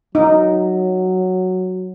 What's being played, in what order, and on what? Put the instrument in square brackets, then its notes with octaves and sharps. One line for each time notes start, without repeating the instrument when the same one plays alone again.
[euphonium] F#3 [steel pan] D#4